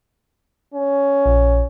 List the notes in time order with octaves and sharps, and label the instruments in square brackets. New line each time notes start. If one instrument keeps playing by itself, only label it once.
[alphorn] C#4
[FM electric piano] A#1